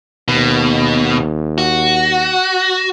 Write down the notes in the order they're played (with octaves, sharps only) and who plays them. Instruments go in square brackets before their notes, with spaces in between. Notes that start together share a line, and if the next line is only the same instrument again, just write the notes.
[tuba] D#2 [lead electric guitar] B2
[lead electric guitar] F#4